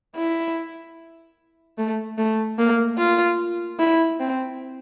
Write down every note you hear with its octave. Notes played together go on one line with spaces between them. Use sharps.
E4
A3
A3
A#3
F4
E4
C4